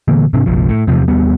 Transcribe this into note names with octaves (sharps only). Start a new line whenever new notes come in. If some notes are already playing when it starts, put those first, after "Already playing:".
A#2 D3 E3 A#3
G#2 C3 C4 D4
F#1 B1 F3
A2
E2 C3 F3
D#2 G3 B3